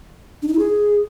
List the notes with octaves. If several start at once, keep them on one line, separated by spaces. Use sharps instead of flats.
D4
D#4
E4
G#4